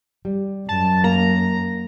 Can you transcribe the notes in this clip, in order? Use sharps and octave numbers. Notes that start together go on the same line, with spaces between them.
G3
F#2 A5
A#3 A#5